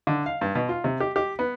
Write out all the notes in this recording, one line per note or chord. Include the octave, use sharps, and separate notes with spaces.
D3
F5
G2
B2
F4
C3
G4
G4
B3